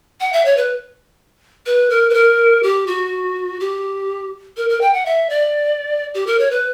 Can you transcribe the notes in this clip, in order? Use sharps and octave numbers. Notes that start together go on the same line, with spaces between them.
F#5
E5
C#5
B4
B4
A#4
B4
A#4
G4
F#4
G4
A#4
A#4
G5
F#5
E5
D5
G4
A#4
C#5
B4